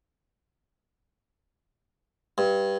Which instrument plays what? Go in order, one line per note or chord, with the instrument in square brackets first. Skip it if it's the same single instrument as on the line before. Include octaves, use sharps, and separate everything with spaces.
[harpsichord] G2